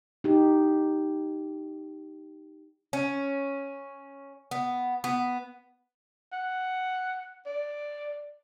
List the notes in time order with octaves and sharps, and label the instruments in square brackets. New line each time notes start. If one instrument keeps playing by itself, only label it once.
[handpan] D#4 G4
[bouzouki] C#4
B3
B3
[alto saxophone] F#5
D5